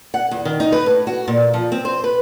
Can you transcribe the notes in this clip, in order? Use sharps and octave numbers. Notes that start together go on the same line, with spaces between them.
F#5
E2
D#3
D#4
B4
A2
F#4
A#2
F3
C4
C5
B4